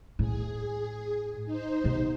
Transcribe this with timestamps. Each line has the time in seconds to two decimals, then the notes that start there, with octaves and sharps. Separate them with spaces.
0.19 A2 G#4
1.45 D#4 C5
1.84 C3 B3